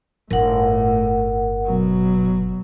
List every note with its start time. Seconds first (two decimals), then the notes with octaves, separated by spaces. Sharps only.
0.31 G1 A2 A#4 F#5
1.65 B2 F#3